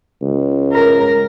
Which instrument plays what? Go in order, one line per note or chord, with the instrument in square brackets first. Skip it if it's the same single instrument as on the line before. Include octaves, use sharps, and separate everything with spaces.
[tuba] C#2
[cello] A#4